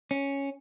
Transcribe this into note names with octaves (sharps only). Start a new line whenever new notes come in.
C#4